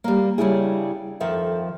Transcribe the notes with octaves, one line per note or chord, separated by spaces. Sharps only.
G3 A#3
C#3 G3 D4 E4 G#4
F2 D#3 F3 A4 E5